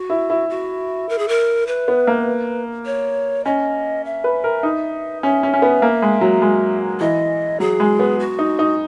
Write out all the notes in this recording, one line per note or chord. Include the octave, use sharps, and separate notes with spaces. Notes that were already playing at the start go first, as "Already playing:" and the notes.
Already playing: F#4
E4
E4
F#4
A#4
G#4
A#4
B4
B3
A#3
C#5
C#4 D#5
E5
B4
A#4
D#4
C#4 E5
C#4
C#4
B3
A#3
G#3
F#3
G#3
E3 D#5
F#3 G#4
G#3
B3
F#4
D#4
D#4